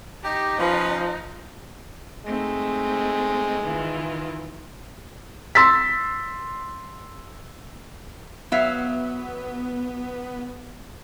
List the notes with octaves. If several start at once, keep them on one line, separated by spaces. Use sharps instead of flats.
D#4 G4
F3 C#4 F4 B4
G#3 A3 C4 D#4
D#3 E3 F4
C6 E6 A6 B6
F#3 B3 E5 F5